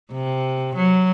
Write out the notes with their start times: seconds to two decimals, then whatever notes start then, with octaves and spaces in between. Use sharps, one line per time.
0.12 C3
0.76 F#3